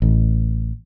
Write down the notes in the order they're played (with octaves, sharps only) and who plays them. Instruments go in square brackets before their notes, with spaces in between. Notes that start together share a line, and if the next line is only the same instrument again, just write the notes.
[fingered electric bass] A1